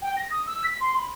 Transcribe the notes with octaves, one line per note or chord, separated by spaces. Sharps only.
G5
A#6
D#6
E6
B6
C6
B5